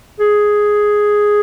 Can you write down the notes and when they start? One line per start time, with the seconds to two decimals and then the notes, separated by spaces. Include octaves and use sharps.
0.19 G#4